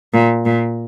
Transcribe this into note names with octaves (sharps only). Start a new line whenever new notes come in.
A#2
A#2